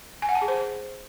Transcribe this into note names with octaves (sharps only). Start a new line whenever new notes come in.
G#5
F#5
A5
G#4
C5